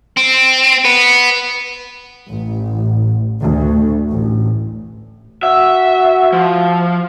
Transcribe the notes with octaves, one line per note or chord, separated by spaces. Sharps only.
C4
B3
A1
D2
A1
F#4 E5
F3